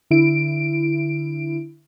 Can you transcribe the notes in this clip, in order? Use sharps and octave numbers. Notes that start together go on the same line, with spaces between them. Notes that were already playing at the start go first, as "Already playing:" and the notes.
D3 E4 D7